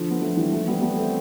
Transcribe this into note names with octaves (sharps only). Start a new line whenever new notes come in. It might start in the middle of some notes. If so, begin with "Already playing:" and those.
Already playing: D3 F3
B3
F3 A3
E3 G3
F3 A3
G3 B3
G3 B3
A3 C4